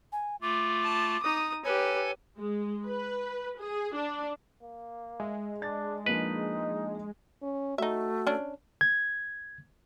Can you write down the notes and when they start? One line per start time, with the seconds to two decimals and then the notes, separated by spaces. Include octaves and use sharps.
0.12 G#5
0.42 A3 F4 D6
0.84 A5
1.23 D#4 D#6
1.64 G4 A4 B4 C#5 G#5 G#6
2.38 G#3
2.86 B4
3.59 G#4
3.95 D4
4.63 A#3
5.20 G#3 E5
5.62 D4 A6
6.06 F3 A#3 D4 D#4 B4
7.42 C#4
7.78 A3 D#4 F#4 E5
8.27 C#4 D4
8.81 G#6